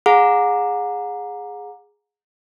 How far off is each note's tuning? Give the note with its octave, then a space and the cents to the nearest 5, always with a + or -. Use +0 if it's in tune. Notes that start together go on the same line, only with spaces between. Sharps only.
G#4 +0 F#5 -40 A#5 +0